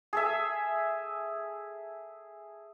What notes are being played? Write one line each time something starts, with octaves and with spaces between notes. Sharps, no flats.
G#4 A4 E5